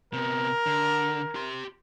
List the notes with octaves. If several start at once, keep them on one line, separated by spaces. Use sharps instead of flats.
C3 B3 A#4
D3
G4 C6